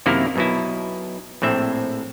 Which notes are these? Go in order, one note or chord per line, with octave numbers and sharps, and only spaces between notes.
F#2 C3 D#3 A#3 E4 A#4
B1 B2 E4
A#1 A2 C4 E5